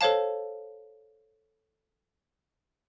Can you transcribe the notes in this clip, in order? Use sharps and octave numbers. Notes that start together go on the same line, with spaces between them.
A4 C5 C#5 F5 A5